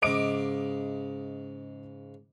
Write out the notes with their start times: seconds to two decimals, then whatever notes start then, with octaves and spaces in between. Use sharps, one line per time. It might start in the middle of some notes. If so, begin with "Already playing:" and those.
0.02 G#2 C#3 D#5 D6 D7